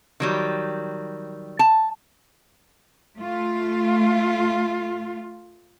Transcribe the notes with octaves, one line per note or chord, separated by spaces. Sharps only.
D#3 F#3 G3
A5
A3 F4